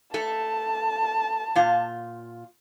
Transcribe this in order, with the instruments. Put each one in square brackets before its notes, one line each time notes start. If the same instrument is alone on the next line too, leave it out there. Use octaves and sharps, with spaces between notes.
[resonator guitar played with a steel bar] A3 A4 [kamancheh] A5
[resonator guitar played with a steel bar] A#2 F4